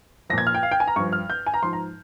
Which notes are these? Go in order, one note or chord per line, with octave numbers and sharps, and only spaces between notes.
A#2 F3 G#6 A#6
F6
G5
F5
G5
G#5
A#5
G2 F3 C#6
F6
G6
G#5
A#5
G#2 F3 C6
A#5